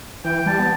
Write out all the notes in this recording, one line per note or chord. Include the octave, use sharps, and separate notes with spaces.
E3 G5
G3 A5
B3